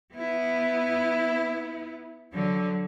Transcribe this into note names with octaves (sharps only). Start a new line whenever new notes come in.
B3 E4
D3 F#3